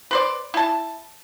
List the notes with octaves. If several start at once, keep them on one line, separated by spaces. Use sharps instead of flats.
B4 C5 D5
E4 A5